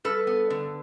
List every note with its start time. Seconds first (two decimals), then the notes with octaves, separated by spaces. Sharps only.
0.04 G2 A4 B4
0.27 B3
0.50 D3